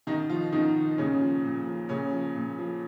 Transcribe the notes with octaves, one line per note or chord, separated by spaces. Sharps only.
B2 D#3 D#4
F3 F4
B2 D#3 D#4
A#2 C#3 C#4
F3
A#2
F3
A#2 C#3 C#4
F3
A#2
F3